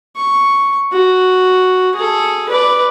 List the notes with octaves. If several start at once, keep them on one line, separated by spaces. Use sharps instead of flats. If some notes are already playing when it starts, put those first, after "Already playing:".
C#6
F#4
G#4 A4
B4 D5